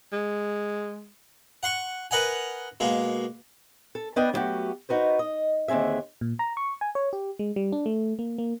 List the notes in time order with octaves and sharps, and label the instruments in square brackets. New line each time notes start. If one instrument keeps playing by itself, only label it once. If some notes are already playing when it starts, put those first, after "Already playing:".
[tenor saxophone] G#3
[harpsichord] F#5 C6 C#6
A#4 B4 D#5 F#5 G#5
B2 G#3 A#3
[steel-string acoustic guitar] A4
B3 D4 B4 D#5 G5
F#3 G3 A3 B3 F#4 G4
D#4 F#4 B4 C5
D#5
D#2 D3 C4 G#4 E5
[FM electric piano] A#2
A#5
C#6
G#5
C#5
G4
G#3
G3
D4
A3
A#3
A#3